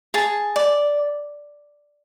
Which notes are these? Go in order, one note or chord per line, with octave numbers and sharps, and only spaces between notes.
G#4 A5
D5